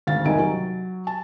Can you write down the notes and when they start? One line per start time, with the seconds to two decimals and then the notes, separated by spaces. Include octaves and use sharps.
0.07 G#1 D2 F5 A6
0.25 F1 C2 D#3 D#4 G#5 D7
0.39 F#3
1.07 A5